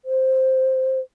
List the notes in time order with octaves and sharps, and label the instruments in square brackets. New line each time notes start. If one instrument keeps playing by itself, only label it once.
[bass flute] C5